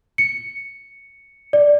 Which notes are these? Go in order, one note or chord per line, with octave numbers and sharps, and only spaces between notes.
C#7
D5